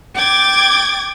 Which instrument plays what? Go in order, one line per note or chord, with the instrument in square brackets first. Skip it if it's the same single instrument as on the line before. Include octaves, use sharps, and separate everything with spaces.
[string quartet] G5 D6 G#6 A6